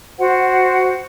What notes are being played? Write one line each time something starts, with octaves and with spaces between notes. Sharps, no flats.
F#4 C5 F#5